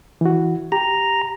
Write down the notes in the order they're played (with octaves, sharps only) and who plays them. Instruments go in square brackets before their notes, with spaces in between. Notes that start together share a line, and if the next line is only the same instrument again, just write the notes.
[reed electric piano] E3 F#4
[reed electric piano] G4 [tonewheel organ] A#5